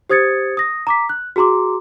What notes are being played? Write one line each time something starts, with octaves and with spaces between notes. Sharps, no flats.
G4 C5 D#6 G#6 A6 C#7
D#6 A#6
A#5 D6 B6
F#6
F#4 G#4 A#5 C6 D6